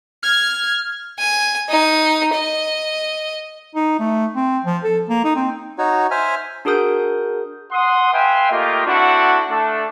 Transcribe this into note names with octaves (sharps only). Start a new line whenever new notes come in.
F6 G#6
G#5
D#4 D#6
D#5
D#4
A3
C4
F3
A4
A#3
D#4
C4
D#4 F#4 C#5
C5 E5 G#5 F6
D4 F#4 G#4 A#4 D#6 G6
F#5 C6 D#6
B4 E5 F5 G5 G#5 C6
A3 A#3 F4 G4 D#5
C4 D4 E4 F#4 A4 F#5
A3 D4 A4